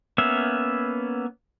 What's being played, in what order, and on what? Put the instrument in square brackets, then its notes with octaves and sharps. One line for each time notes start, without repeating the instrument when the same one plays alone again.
[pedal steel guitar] A#3 B3 C#4 E5